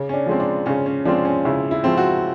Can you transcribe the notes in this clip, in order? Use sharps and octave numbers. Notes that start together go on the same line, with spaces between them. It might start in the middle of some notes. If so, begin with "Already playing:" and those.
Already playing: C#3
C#4
D4
F3 G#3 C4
D4
C#3 C#4
C#4
F3 G#3 C4 D4
C#4
C#3 E4
E4
F3 G#3 C4
F#4